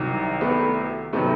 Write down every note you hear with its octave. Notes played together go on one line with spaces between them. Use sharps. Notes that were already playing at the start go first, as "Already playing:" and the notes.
Already playing: C2 C3 D#3 F#3
A3 B3
C3 D#3 F#3 A3 B3